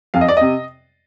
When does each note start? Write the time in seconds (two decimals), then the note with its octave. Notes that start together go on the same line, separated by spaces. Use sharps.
0.14 F2 F5
0.21 D#5
0.28 D5
0.37 C3 D#5